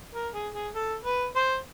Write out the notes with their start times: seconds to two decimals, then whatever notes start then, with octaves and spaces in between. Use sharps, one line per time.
0.14 A#4
0.34 G#4
0.53 G#4
0.74 A4
1.05 B4
1.35 C5